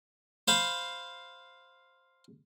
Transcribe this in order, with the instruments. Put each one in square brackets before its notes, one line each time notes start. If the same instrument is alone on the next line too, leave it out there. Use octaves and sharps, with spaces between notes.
[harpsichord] C5 F5 B5